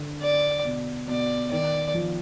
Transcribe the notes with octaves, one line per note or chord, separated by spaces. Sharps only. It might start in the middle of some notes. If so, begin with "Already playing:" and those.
Already playing: D3
D5
B2
B2 D5
D#3 D5
F3